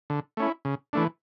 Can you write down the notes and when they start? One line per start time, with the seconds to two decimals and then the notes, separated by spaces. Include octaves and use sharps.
0.10 D3
0.37 A3 C#4 E4
0.65 C#3
0.93 E3 A3 D4